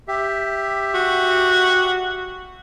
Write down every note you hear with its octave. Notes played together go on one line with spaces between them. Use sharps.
G4 E5
F#4